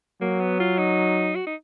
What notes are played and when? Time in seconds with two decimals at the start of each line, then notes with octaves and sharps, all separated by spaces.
0.21 F#3 A#3
0.41 B3
0.60 F4
0.79 D#4
1.35 F#4
1.47 D#4